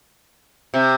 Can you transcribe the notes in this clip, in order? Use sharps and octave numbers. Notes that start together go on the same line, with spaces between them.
C3